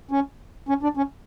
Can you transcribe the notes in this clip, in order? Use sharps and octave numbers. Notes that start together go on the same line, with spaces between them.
C#4
C#4
D4
C#4